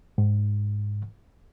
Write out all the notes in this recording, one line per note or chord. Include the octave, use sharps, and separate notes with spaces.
G#2